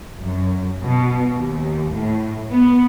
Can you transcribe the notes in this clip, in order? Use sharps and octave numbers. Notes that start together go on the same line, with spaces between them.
F#2
B2
D#2
A2
B3